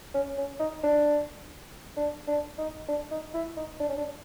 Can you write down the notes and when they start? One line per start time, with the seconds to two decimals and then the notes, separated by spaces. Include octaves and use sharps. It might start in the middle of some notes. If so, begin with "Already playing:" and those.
0.14 C#4
0.38 C#4
0.60 D#4
0.83 D4
1.97 D4
2.27 D4
2.58 D#4
2.88 D4
3.11 D#4
3.34 E4
3.57 D#4
3.80 D4
3.89 C#4
3.97 D4